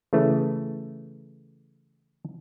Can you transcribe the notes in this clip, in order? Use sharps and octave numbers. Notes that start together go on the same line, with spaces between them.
C#3 E3 A3